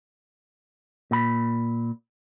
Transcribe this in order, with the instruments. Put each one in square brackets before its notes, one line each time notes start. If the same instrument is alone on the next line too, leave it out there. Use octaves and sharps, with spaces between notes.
[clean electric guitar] A#2 B5